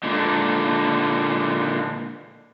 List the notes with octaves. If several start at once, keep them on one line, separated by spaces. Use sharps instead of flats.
A#2 D3 G#3